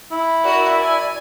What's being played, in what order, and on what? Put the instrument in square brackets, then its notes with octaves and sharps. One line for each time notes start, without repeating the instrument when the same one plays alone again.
[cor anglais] E4
[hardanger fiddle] F#4 A#4 [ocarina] D5
[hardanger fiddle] G#5